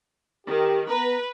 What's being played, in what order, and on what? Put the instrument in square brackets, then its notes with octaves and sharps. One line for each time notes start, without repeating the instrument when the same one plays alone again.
[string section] D#3 [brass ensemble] G4
[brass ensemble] B3 A#5 [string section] B4